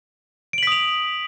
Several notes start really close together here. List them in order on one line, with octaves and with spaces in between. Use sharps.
D7 F#7 B6 D#6 F7